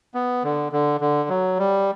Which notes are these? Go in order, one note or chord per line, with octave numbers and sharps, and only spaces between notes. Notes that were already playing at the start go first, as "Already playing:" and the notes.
B3
D3
D3
D3
F#3
G3